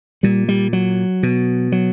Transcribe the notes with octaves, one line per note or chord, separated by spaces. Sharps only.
A#2 G3
G3
F#3
B2
F#3